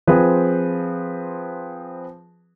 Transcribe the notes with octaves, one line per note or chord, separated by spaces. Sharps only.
F3 C4 G#4 B4